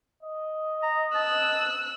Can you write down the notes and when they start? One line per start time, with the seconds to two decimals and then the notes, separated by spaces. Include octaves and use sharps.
0.23 D#5
0.83 A#5
1.15 A5 E6 F#6